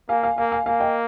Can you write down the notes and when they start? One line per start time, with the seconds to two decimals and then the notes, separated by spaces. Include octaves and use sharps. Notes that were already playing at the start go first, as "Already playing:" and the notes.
0.09 A#3 F5 G#5
0.23 F5 G#5
0.38 A#3 F5 G#5
0.52 F5 G#5
0.66 A#3 F5 G#5
0.80 D#5 G5